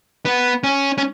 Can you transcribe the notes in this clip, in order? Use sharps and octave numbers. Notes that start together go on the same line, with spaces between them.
B3
C#4
C#4